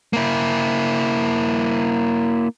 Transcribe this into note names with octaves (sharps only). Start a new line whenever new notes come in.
A#3 E4